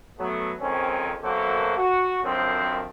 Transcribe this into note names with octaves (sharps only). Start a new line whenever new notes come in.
F#3 A3 B3
F2 D#3 G#3 C4 C#4
F#2 B2 A#3 F#4 A4 C5
F#4
F#2 D3 D#3 F3 C4